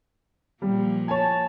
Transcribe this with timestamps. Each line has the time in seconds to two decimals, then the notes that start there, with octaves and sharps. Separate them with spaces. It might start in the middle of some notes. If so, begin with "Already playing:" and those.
0.62 A#2 F3 G3 A#3
1.08 C#5 G#5 A5